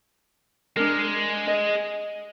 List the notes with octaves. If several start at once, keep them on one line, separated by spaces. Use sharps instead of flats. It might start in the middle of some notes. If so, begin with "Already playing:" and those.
G#3 D4 A#4
D#5